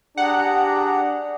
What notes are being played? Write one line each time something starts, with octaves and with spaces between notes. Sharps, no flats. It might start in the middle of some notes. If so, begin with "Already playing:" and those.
D4 G4 G#4 F#5 A#5